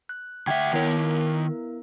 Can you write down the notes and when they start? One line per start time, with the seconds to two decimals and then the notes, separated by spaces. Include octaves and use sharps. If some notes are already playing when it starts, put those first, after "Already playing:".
0.09 F#6
0.47 D2 E5 F#5 G5 G#6
0.73 D#3 B3 E4 A#4 C#5